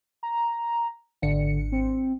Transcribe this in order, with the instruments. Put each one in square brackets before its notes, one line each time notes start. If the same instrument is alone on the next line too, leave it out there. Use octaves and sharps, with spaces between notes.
[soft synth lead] A#5
[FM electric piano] G#1 D4 C#7 [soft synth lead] D3
[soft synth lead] C4